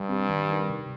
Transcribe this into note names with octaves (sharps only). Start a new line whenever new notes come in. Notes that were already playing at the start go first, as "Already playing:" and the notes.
Already playing: G2 G3
C4 G4
D#3
G3 D#4 A#4
C3